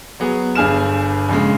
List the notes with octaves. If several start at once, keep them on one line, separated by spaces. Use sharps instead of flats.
F#3 B3 G#4
G1 G2 G#4 G#5 F6 E7
A#1 C#3 G#3